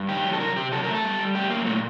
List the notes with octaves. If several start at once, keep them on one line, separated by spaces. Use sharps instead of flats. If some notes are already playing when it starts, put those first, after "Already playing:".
Already playing: G2
D#3 G4
F#3
A4
C3 A#4
C3 G4
F#3 A4
A3 A#4
A4
G3
G3
A3 G4
F#3 A#3
A#2 A3